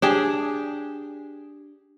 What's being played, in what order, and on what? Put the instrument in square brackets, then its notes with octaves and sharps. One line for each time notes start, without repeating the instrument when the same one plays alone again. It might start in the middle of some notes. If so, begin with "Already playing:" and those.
[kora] D4 G4 G#4